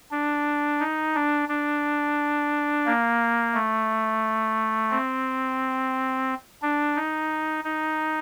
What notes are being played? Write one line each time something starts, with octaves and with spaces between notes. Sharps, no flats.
D4
D#4
D4
D4
A#3
A3
C4
D4
D#4
D#4